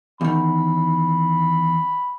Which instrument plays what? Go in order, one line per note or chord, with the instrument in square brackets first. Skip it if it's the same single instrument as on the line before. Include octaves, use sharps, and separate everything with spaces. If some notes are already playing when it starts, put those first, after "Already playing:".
[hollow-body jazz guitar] E2 D#3 [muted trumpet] B5